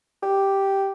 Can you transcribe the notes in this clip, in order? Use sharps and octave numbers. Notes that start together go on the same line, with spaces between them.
G4